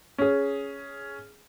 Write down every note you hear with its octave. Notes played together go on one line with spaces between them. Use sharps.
C#4 G#4